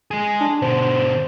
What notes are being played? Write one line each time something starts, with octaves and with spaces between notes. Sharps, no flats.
G#3 G#4
D4
B2 D3 C5